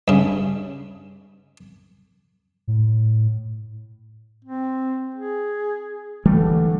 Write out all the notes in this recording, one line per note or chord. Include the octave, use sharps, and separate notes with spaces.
G2 C#3
A2
C4
G#4
D3 E3 G3 A3